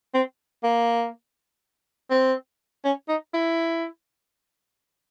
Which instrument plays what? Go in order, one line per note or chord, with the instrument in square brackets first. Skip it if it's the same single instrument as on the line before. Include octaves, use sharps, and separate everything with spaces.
[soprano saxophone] C4
A#3
C4
C#4
D#4
E4